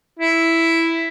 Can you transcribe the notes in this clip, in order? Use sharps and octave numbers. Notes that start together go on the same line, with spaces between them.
E4